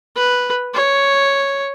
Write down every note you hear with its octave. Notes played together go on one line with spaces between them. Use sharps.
B4
C#5